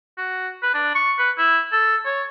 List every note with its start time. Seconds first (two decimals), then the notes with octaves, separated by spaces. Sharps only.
0.18 F#4
0.63 B4
0.74 D4
0.95 C#6
1.18 B4
1.38 E4
1.72 A4
2.06 C#5